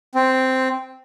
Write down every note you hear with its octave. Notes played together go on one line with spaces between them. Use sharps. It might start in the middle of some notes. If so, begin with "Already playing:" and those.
C4